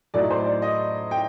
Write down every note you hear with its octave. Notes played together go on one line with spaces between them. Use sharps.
A2 F#3 A3 D#4 D5
C5
D5
D#5
G5